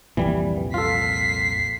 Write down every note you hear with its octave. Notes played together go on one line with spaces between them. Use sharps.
C2 F2 A#2 E3 G3
F4 A4 B6 C7